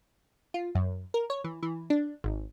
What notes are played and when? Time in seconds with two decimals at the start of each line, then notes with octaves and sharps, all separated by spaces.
0.54 F4
0.75 F#2
1.14 A#4
1.30 C#5
1.44 E3
1.63 E3
1.90 D4
2.24 G#1